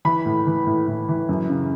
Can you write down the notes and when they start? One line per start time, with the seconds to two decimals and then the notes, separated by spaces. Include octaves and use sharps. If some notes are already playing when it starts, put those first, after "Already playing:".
0.05 E3 B5
0.26 A2
0.47 E3
0.67 A2
0.88 A2
1.09 E3
1.29 F#2
1.49 C#3